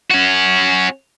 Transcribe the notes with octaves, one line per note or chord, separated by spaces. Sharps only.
C#4 F#4